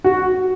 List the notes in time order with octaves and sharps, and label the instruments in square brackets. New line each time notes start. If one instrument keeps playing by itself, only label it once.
[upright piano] F#4